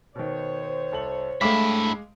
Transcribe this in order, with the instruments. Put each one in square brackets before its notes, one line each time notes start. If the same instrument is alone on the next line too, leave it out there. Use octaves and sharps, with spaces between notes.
[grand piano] B2 D#3 [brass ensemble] C5 C#5
[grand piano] C2 A4 F#7
[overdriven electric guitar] G2 E4 [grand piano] G#3 F5 D6 [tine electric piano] A3 B6